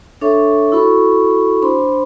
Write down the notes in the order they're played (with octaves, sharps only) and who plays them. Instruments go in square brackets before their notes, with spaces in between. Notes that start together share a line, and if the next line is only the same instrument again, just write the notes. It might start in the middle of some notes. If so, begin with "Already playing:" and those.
[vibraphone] D4 A4 C#5 E5 C#6
E4 F#4 A4 B5 C#6
D4 C5 B5 C6